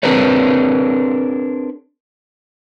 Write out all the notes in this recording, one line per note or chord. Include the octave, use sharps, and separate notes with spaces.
C4 D4 G#4 A#4 B4 C#5